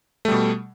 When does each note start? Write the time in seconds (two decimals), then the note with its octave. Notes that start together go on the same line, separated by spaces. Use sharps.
0.25 A3
0.28 G3
0.32 B2